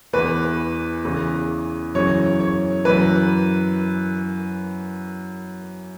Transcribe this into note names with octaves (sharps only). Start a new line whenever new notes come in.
E2 E3 B4
E2 C#3 E3
F#2 C#3 E3 C#5
C#5
F#2 E3 B4